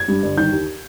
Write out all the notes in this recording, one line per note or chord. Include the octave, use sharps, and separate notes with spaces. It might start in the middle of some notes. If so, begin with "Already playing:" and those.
Already playing: G#6
G2
G1
D#3 G6
D#2